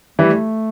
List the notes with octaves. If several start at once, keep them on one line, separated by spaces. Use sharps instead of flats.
E3 G3 A3